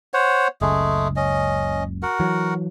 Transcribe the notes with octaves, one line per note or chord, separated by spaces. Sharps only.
C5 C#5 F#5
F#1 C#2 G#3 A3 G#4
C#4 D#5
F#4 A#4 F#5
E3 F#3